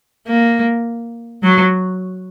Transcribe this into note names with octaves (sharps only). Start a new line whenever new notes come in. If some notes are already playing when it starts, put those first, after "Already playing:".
A#3
F#3